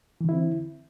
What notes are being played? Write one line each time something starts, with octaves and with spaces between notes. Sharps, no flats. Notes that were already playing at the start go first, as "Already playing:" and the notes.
D3 E3 C4 E4